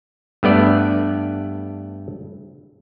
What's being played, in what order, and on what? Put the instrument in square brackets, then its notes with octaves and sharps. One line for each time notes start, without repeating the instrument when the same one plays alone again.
[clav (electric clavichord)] G2 A3 B3 D5